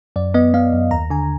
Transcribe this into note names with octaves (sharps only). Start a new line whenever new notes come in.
F#2 D5
B3 D#5
B3 F5
F#2
D#2 A#5
D3 G#5